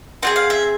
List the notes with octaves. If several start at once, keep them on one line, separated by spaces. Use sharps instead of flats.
C4 F4 G#4 F#5
F5
E5